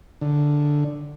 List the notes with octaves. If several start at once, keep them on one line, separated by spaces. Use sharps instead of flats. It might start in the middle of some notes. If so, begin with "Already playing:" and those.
D3